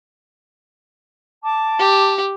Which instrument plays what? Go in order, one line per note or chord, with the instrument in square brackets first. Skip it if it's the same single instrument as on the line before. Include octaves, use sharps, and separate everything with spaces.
[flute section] A5 D6
[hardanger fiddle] G4